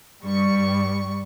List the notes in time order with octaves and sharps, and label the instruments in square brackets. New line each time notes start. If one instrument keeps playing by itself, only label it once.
[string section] G2 C#6 [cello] G3